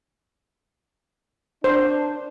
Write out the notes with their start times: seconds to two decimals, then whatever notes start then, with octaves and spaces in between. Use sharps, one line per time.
1.64 D4 C5